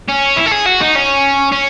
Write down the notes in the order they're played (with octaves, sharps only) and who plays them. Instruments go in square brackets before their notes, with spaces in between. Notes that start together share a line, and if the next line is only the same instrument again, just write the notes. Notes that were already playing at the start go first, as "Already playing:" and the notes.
[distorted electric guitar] C#4
E4
A4
G#4
F#4
D#4
C#4
C#4